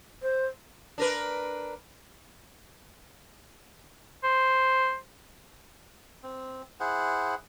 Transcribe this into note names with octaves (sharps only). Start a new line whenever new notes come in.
C5
D4 A#4 B4
C5
C4
E4 G#4 C5 F#5